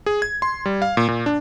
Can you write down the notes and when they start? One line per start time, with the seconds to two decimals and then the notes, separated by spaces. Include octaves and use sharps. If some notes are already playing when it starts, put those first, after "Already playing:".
0.06 G#4
0.22 G#6
0.42 C6
0.66 G3
0.82 F5
0.97 A#2
1.08 A#2
1.26 D4